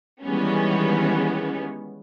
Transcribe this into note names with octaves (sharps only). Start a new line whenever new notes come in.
D#3 E3 G3 G#3 B3 C#4